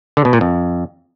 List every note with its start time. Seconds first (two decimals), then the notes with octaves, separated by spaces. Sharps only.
0.17 D3
0.25 B2
0.33 A#2
0.41 F2